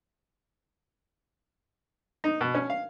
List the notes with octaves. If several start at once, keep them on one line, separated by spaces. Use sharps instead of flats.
D#4
B2
C#4
F5